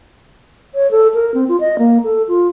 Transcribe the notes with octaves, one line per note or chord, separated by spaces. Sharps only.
C#5
A4
A#4
C4
F4
D#5
A#3
A4
F4